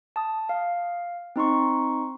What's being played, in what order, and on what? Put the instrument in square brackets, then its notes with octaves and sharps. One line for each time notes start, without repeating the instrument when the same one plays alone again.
[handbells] A5 D#6
F5
C4 D#4 C6 C#6